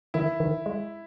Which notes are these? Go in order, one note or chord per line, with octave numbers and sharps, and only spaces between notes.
D#3 E4
D#3
G#3